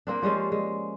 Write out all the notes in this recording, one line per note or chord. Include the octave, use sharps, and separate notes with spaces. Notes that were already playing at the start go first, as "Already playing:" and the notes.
A#3 C4 D4
F3 G3 G#3 C#4
G#3